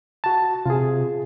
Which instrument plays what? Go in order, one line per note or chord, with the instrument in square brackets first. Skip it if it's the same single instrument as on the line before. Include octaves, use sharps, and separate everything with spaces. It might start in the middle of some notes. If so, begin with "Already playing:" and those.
[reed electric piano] F#4 A5
[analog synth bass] C3 [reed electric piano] F4 G#4